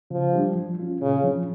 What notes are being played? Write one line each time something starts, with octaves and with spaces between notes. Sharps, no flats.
C#3 F3
G3 D4 G4
F3
C#4 F4
A#2 C#3
F3 C#4